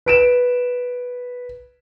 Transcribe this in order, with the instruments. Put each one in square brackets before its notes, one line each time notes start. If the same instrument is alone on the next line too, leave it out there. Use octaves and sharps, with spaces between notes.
[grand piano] B4 D7 E7